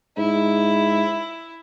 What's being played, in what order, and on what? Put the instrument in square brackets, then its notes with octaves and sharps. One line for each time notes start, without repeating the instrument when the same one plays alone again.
[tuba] G#2 [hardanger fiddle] E4